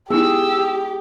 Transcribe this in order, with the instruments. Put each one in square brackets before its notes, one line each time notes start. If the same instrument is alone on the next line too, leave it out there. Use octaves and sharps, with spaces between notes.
[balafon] B3 D#4 E4 [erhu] G4 [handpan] G#4 [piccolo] E6